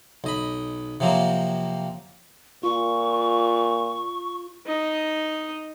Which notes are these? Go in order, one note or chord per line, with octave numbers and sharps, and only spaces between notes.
B1 D#5 B5
C3 F3 F#3 A#3 C4
A#2 F4 C#6
D#4 D#5